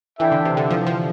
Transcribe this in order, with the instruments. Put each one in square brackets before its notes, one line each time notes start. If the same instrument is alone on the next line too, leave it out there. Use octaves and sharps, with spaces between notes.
[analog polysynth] E3 [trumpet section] D4 A4 E5 G5
[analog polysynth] D3
C3
D3
F3
F3